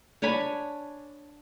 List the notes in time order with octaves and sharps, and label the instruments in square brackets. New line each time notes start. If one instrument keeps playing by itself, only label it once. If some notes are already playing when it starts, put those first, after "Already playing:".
[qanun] D4 C#5 G#5 B5